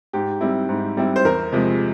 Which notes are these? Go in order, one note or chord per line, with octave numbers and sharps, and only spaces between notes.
G#2 G4
G3 C4 E4
G#2
G3 C4 E4
C5
E2 A#4
C3 F3 G#3